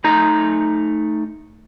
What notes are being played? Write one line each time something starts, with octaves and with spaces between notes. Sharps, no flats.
A3 D#4 A#5